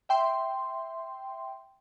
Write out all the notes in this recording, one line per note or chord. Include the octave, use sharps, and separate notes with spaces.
E5 G5 C6